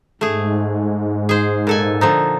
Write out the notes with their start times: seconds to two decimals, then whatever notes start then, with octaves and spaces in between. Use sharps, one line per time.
0.21 G#2 A3 G#4
1.29 G#4 C5
1.67 A#2 A4 G#5
2.01 D3 F3 D#4